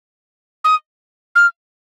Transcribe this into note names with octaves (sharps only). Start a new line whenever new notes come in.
D#6
F6